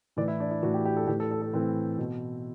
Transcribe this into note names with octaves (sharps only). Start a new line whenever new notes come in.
A2 E3 D5
E4
D4
E4
A2 E3 F#4
G4
G4
A4
A2 E3 G4
A4
A4
A4
A2 E3 C4
B2